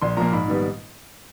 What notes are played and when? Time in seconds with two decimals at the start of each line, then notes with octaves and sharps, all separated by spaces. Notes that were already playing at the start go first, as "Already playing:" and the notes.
0.01 A#1 C6
0.17 A#2 F3 A#3 A#5
0.32 G#2 B5
0.48 D#3 G3 B3